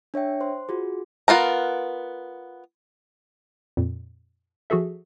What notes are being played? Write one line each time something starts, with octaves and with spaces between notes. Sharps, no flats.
D4 C#5 E5 G5
C5 C6
F4 F#4 G#4
B3 F4 A#4 A#5
F2 A#2
F3 F#4 G#4 A4 E5